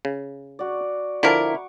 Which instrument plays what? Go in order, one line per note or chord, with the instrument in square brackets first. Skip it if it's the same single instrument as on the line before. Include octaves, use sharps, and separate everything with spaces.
[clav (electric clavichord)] C#3
[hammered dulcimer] F#4 D5
[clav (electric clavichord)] D3 F3 A5 [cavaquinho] E4 A#4 [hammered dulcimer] C#6 D6